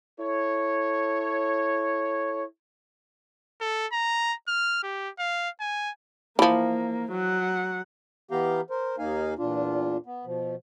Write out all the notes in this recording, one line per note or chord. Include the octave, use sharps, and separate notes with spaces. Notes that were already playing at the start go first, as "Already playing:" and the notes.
E4 A4 C#5
A4
A#5
F6
G4
F5
G#5
E3 F3 A#3
F#3 F#5
E3 B3 G4 F5 G5 A#5
A#4 C5
D#2 A#3 D#4 F5 G#5
E2 A#2 D4 F4
B3
B2 F3